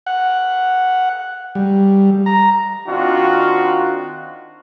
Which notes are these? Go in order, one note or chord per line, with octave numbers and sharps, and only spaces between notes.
F#5
G3
A#5
D#3 C4 D4 F4 F#4